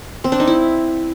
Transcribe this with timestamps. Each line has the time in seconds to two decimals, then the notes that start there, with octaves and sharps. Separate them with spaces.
0.24 C4
0.32 D4
0.40 D#4
0.47 E4